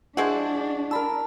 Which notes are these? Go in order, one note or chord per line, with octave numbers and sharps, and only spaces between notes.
F3 G#3 D4 E4 F#4 G#4
A#4 A5 B5 E6